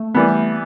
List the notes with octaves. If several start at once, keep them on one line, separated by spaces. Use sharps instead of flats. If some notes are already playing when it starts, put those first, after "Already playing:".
Already playing: A3
E3 G3 B3